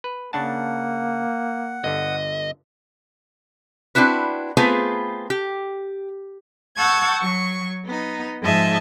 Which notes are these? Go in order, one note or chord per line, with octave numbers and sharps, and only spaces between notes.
B4
C#3 A#3 D4 F#5 A5
G1 D3 D#5
C4 D4 E4 F#4 B4
A3 B3 C4 F4 G#4 B4
G4
F#5 A5 C#6 E6 G6 G#6
F#3 C#6
B3 D#4
G#2 F3 D#5 E5 A5